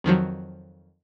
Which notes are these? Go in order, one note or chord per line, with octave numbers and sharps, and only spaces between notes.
F2 D#3 F3 F#3